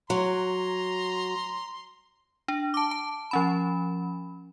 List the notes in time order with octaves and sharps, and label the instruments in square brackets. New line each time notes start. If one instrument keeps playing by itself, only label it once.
[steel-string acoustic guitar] F#3 [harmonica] A#5 C6
[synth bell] D4
A5 D6
A5
F3 C#4 B5